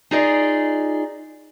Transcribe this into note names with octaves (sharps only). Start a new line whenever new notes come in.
D#4 F4 G#4 D5 D#5